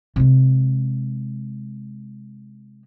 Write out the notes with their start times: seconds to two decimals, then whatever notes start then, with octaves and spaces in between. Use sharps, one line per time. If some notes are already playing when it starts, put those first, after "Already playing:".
0.16 C3 G#3